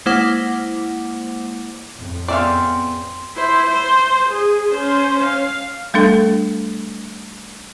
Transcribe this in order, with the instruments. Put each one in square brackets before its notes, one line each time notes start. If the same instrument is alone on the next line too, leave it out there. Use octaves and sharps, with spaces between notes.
[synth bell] G#3 A#3 E4 C5 F#5 D6
[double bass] F2 A2
[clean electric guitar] B3 C4 G#4 [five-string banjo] D5 E5 F5 [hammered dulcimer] G5 C6
[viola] E4 C5
C5
G#4
C#4 C5
F5
[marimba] G3 A3 D4 A4